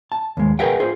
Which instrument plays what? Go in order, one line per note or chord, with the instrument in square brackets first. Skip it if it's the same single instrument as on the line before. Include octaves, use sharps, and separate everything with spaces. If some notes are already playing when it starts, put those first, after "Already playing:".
[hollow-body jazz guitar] A5
D#2 G#3
G#4 A#4 B4 E5 F#5 G5
F4 G#4 C5